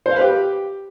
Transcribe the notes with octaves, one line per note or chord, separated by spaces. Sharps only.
C5
F5
B4
G4